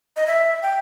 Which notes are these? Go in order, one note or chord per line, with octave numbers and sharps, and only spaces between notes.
D#5
E5
G5